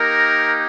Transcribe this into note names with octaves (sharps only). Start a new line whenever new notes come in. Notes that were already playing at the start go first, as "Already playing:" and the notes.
Already playing: A#3 D#4 G4 A#4